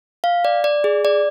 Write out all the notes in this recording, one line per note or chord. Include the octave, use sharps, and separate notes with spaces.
F5
D5
D5
G#4
D5